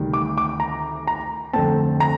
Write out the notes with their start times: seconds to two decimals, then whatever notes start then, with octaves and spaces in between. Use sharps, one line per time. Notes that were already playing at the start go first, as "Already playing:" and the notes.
Already playing: D2 C3 D#3 G3
0.13 D6
0.37 D6
0.60 A#5
1.07 A#5
1.53 F2 D3 A3 C4 A5
2.00 A#5